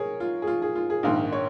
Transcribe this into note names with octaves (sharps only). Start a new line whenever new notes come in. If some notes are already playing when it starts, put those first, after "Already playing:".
Already playing: G#4 A#4 C#5
F4
G#4
F4
G#4
F4
G#4
A#1 G#2 D#3 A#3 F5
C#5